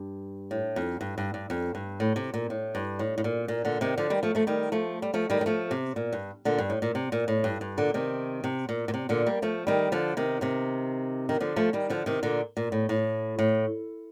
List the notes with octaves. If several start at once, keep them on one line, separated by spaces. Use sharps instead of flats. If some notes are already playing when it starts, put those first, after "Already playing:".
Already playing: G2
A2
F2
G2
G2
G2
F2
G2
A2
C3
A#2
A2
G2
A2
A2
A#2
A#2
A#2 D3
C3 D#3
D3 F3
D#3 G3
F3 A3
F3 A3
D#3 G3
F3 A3
G3
F3 A3
D#3 G3
G3
F3 A3
C3
A#2
G2
A#2 D3
G2
A2
A#2
C3
A#2
A2
G2
G2
A#2 D3
C3 D#3
C3
A#2
A#2
C3
A#2 D3
G3 A#3
F3 A3
D#3 G3
D3 F3
C3 D#3
C3 D#3
D#3
D3 F3
F3 A3
D#3 G3
D3 F3
C3 D#3
A#2 D3
A#2
A2
A2
A2